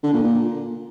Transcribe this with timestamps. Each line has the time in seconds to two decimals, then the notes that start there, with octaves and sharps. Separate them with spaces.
0.03 D3
0.14 A#2
0.24 A#2